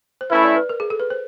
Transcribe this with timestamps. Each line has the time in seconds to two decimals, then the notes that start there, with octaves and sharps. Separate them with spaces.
0.21 C5
0.30 A3 C#4 E4 B4
0.43 D5
0.56 B4
0.69 A#4
0.80 G#4
0.90 A4
1.00 B4
1.10 C5